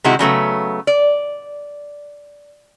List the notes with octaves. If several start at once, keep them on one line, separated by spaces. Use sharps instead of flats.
C3 D#3 G#3 E4 F#4
C#3 F#3 A3 B3
D5